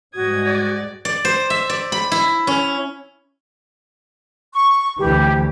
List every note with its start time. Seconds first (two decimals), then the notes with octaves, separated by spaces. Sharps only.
0.15 G#2 G3 G#3 F#4 D#6 G#6
0.46 D5
1.05 D5
1.25 C5
1.50 E5
1.69 D5
1.92 B5
2.12 E4
2.47 C#4
4.53 C#6
4.99 D2 E3 G4